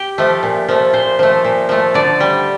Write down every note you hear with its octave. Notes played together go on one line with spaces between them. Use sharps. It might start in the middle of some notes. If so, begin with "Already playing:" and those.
Already playing: G4
F3 A3
A#2
F3 A3
A#2 C5
F3 A3
A#2
F3 A3
D3 D5
G3